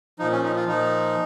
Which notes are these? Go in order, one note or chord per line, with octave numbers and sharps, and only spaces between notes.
A#2 F3 D#4
C#4
D#4
F4
A#2 F3 D#4